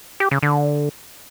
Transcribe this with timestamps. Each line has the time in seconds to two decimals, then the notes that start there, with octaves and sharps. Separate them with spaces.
0.20 G4
0.31 C#3
0.43 D3